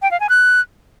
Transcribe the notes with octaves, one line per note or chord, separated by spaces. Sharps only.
G5
F5
G#5
F#6